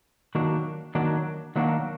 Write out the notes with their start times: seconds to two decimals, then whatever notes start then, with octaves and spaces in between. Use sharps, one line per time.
0.35 D#3 F#3 A#3 D4 F#4
0.95 D#3 F#3 A#3 D4 F#4
1.56 D#3 F#3 A#3 D4 F#4